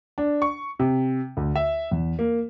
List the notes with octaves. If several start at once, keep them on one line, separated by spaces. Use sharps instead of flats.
D4
C#6
C3
D2
E5
E2
A#3